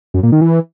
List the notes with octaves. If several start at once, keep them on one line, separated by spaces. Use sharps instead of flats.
F#2
A#2
D#3
E3